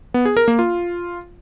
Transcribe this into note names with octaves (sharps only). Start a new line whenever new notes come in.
B3
G#4
A#4
A#3
F4